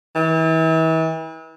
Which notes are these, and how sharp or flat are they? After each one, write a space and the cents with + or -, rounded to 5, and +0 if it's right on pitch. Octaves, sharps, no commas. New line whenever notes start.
E3 -35